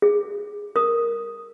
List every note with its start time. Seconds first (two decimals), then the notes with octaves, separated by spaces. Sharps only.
0.02 G#4
0.76 A#4 D#6